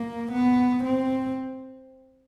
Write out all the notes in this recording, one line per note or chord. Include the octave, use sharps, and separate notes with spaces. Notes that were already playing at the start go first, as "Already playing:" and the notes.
Already playing: A#3
B3
C4